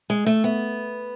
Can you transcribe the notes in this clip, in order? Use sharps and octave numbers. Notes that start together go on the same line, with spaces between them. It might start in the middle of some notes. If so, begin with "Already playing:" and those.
G#3
A3
B3